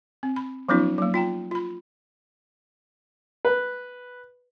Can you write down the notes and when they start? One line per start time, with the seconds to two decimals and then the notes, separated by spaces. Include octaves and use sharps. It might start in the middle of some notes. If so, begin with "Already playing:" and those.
0.23 C4
0.36 B5
0.69 F3 F#3 B3 C#4 D#4 F4
0.98 F#3 A#3
1.14 F4 G5 A#5
1.51 F4 B5
3.45 B4